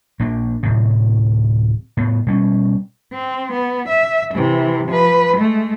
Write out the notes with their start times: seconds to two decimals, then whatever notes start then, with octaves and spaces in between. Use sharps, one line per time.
0.20 A#1 A#3 D4
0.63 D1 A2 C3
1.97 A2 B3
2.27 B2 G3 C4 C#4
3.13 C4
3.53 B3
3.89 E5
4.35 C3 E3
4.87 F3 B4
5.37 G#3 A3